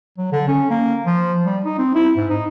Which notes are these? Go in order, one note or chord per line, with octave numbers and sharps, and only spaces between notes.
F#3
D3
C#4
A#3
F3
G3
D#4
C4
E4
G#2
D#4